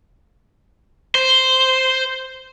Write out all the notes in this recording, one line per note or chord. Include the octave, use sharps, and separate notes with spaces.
C5